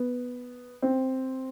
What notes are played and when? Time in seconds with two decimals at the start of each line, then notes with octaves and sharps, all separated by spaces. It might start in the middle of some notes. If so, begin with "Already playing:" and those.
Already playing: B3
0.82 C4